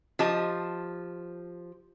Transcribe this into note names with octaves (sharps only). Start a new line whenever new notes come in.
F3 G4 D#5 A5